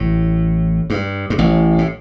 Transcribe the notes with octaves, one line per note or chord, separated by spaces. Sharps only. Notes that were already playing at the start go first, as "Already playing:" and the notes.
Already playing: A1 A2
G2
G2
A1 A2
A2